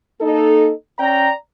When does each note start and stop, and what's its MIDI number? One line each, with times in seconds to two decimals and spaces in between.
0.21 0.71 58
0.21 0.71 63
0.21 0.71 69
0.99 1.31 61
0.99 1.31 74
0.99 1.31 79
0.99 1.31 82